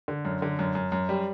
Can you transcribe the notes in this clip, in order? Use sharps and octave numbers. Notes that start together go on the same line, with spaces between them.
D3
F#2
D3
F#2
F#2
F#2
G3